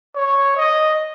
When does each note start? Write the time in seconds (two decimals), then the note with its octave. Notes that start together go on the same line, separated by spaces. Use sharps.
0.15 C#5
0.57 D#5